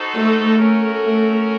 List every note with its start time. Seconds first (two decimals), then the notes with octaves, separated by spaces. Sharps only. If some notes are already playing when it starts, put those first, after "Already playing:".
Already playing: D#4 F#4 A4 C5
0.13 A3
0.58 A3 C#4 F#4 A#4
1.02 A3